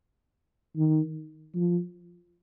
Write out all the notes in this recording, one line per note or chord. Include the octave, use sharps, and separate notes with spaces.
D#3
F3